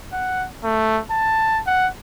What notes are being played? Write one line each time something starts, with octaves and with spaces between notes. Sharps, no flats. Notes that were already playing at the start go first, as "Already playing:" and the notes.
F#5
A3
A5
F#5